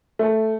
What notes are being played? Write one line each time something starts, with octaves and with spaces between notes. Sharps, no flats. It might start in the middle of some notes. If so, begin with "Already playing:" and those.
A3